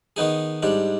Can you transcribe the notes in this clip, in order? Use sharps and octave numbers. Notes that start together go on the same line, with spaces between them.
D#3 B3 D#4 G#4
G#2 G3 D4